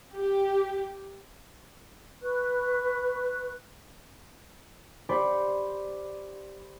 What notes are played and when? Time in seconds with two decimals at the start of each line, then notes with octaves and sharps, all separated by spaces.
0.15 G4
2.22 B4 C#6 F#6
5.09 G4 C5 D5 B5 C#6